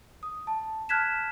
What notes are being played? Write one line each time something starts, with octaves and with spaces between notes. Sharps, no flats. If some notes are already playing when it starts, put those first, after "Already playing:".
D#6
A5
A5 F6 F#6 G#6 B6 E7